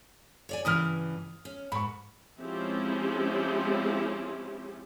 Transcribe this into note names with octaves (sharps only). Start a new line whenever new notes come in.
C#5 D5 G#5
G2 C#3 E3 D#6 F6
C#4
G#2 B5 C#6
F3 G#3 C4 C#4 E4 G4